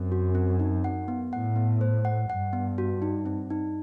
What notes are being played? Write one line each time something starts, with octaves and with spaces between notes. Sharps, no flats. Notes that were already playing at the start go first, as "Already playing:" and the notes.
Already playing: F#2 C4
F#4
C4
D#4
F#5
B3
A2 F#5
B3
C5
F#5
G2 F#5
B3
F#4
D#4
C4
D#4